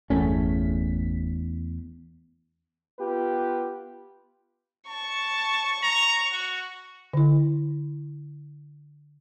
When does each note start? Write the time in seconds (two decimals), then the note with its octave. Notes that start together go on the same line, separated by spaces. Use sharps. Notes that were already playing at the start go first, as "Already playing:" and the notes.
0.10 G1 E2 A3 C#4 B6
2.99 B3 F4 G4 B4
4.88 A5 C#6
5.83 A#5
6.32 F#4
7.13 D3 E4